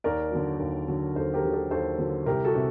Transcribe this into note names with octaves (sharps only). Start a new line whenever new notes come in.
D#2 A#4 D5
D3 F#3
D#2
D3 F#3
D#2 A4 C5
G4 A#4
D3 F#3
A4 C5
D#2 A4 C5
D3 F#3
C2 G4 A#4
F#4 A4
C3